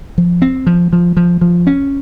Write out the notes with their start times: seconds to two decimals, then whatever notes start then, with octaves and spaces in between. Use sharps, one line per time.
0.18 F3
0.42 C4
0.67 F3
0.93 F3
1.17 F3
1.41 F3
1.67 C#4